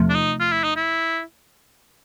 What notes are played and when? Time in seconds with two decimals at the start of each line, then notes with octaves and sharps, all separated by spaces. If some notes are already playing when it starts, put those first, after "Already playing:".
Already playing: E2 C3 F3 A3
0.10 D4
0.15 D#4
0.40 F4
0.52 E4
0.64 D#4
0.76 E4